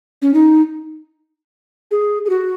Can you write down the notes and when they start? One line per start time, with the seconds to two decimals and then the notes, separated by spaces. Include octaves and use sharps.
0.22 C#4
0.34 D#4
1.91 G#4
2.25 G#4
2.30 F#4